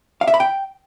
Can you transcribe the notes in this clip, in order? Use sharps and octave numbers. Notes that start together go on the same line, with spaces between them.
F5
E5
B5
G5